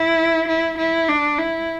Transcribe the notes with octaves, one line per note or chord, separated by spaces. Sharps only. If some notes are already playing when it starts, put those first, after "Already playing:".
Already playing: E4
E4
E4
D4
E4